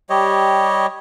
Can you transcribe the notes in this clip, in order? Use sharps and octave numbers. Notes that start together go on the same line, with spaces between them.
G3 G4 C#5 D#5